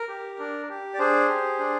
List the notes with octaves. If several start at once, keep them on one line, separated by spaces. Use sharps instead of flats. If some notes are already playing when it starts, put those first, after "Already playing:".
Already playing: A#4
G4
D4
G4
D5
D4 G#4 C5
G4
D4